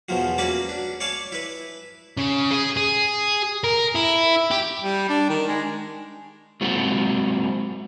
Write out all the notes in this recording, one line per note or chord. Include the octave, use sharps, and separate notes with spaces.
E2 B2 F3 F#3
A#3 C#4 F#4 B4 D5 A5
D4
C#5 D5 F5 G#5 A5
E4 B4
C#3
G#4
G#4
A#4
E4
G4
G3
D4
D#3
G#3
F#3 G#3 A#3 C4 F4 F#4